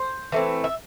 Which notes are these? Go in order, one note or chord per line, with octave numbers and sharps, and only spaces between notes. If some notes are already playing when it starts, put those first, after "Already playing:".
Already playing: C5
E3 A3 C4
E5